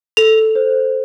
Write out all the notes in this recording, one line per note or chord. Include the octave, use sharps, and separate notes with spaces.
A4 F7
C5